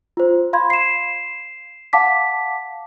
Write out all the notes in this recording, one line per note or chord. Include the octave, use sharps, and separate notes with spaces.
F4 C5
F5 B5 C6 G#6
C7 E7
F5 F#5 A5 D6 B6